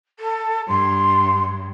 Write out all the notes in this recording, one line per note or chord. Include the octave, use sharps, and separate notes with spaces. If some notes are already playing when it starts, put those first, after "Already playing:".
A4
G2 C6